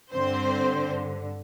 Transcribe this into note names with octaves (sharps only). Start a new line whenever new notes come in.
G2 D3 C4 C5